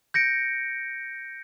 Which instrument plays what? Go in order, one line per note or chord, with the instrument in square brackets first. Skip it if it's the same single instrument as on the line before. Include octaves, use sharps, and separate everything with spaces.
[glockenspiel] G6 A#6 C#7 D7